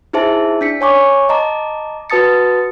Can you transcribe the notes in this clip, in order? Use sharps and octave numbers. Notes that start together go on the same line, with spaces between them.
D#4 E4 G#4 C5 E5 A5
D4 B6 C#7
C#5 G#5 C#6 D6
D#5 A5 A#5 D6
F#4 B4 A5 D#6 A6 C#7